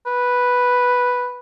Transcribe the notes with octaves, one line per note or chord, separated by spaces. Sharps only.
B4